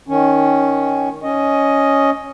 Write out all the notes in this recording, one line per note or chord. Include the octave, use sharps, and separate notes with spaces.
D#3 C#4
C#4 D#5